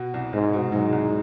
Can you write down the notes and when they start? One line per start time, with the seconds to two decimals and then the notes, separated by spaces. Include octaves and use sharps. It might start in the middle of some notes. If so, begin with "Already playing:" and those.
Already playing: B2
0.14 C2
0.33 C2 G#2
0.53 B2
0.72 G#2 F#3
0.92 C2